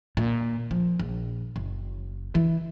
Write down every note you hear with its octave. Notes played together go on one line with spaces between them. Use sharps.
A#2
F3
A#1
F#1
E3